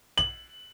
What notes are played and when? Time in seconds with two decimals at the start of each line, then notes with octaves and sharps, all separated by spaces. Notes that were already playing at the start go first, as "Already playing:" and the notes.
0.18 F#7